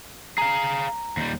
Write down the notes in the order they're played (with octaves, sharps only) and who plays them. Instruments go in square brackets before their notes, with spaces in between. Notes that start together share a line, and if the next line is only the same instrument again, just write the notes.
[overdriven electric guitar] G#4 F5 [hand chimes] A#5
[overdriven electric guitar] D#2 G3